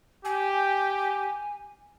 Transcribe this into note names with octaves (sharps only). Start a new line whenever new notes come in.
G4 G#5